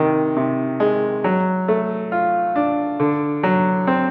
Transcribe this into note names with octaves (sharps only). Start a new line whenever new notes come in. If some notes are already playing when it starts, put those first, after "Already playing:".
Already playing: C3 D#3
C3
G#3
F#3
A3
F4
D4
D3
F#3
C4